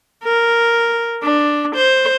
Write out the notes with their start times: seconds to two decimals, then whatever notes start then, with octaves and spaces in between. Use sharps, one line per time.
0.24 A#4
1.23 D4
1.75 C5